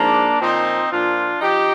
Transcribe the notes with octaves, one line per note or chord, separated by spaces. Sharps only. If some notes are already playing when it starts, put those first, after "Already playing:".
Already playing: G#2 F3 A#3 D4
A#2 F3 C4 D#4
A#2 F3 D4 F4
F3 D#4 G4